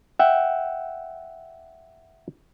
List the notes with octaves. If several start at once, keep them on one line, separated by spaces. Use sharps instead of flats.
E5 F#5 G5